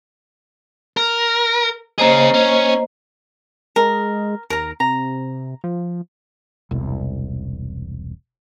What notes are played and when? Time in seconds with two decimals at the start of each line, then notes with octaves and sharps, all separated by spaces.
0.97 A#4
1.98 A#3 C#4 G#4 C5 D#5
2.34 C#4
3.76 G#3 A#4
4.50 D#2 A#4 A#5
4.80 C3 A#5
5.64 F3
6.71 E1 C2